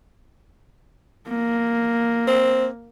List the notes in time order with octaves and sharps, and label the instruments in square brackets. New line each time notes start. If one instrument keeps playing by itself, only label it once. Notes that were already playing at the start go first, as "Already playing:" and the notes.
[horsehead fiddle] A#3
[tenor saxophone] C4